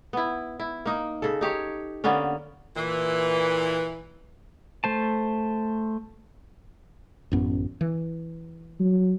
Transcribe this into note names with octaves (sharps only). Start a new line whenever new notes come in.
B3 E4
E4
A#3 D#4
C#3 A4
D#4 G4 C#5
D3 A#3 B3 C#4
A#2 E3
A3 C5 A5
A1 F#2 B3
E3
F#3